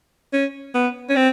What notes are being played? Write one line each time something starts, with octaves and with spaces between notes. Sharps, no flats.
C#4
B3
C#4
C4